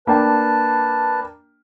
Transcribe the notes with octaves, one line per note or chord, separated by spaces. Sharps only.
A#3 D4 B4 G5 A5